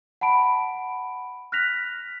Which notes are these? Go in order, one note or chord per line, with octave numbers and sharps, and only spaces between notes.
F#5 A5 B5 D7
F6 F#6 A#6 B6 F7